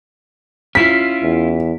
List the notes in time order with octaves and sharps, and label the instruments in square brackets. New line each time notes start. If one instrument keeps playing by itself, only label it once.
[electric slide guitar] C#4 E4 F4 [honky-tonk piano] B6
[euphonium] E2